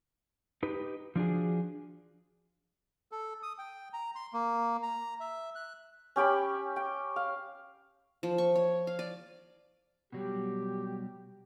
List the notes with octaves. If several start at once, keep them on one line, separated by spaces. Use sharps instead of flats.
D#4 G4 B4
F3 D4 F#4 G#4
A4
D#6
G5
A#5
C6
A#3
A#5
E5
F#6
C#4 G4 G5 B5
G5
F5
F3
C#6
C#5
F5
D5
B2 F#3 G3 G4